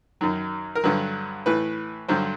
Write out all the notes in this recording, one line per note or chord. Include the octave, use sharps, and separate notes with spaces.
F#2 D#3 F#3
A#4
G2 D3 F#3 B4
A2 E3 B4
G2 D3 F#3 C5